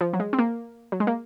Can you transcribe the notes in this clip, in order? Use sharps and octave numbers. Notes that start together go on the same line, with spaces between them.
F3
F#3
G#3
C4
A#3
F#3
G#3
A#3